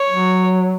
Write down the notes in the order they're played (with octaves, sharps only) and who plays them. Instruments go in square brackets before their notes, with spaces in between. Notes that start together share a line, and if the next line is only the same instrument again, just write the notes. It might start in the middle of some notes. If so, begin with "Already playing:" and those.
Already playing: [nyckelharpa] C#5
[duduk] F#3